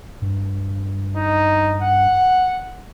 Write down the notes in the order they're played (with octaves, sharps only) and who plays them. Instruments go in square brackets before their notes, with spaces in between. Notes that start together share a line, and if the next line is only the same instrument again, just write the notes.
[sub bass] G2
[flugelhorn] D#4
F#5